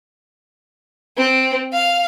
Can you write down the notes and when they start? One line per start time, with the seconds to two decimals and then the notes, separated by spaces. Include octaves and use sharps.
1.17 C4
1.73 F5